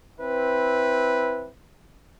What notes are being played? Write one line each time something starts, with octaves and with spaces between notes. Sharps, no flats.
C4 E4 B4